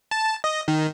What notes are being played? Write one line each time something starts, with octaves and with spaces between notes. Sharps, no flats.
A5
D#5
D#3